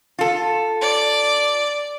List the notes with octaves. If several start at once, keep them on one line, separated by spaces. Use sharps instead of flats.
F4 A4
D5